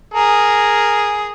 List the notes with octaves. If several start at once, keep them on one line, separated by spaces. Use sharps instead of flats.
G#4 A#4